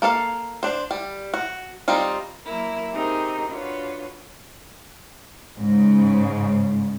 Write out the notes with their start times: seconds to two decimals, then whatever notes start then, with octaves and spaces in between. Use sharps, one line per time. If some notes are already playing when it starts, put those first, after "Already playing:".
0.02 A#3 A4 C5 F5
0.63 D4 C5
0.91 G3
1.34 F#4
1.88 G3 C4 D#4 F4
2.44 F#3 A#3 E4 A#4
2.92 C4 D#4 G4 G#4 A#4
3.48 D4 F4 F#4 B4 C#5
5.57 G#2 C#3